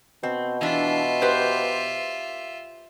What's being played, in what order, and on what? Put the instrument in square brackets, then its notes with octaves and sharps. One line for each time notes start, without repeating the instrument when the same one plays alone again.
[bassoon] B2 [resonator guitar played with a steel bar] C4
[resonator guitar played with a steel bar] E3 D4 [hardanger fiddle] F4 E5
[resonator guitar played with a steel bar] G4 B4 C5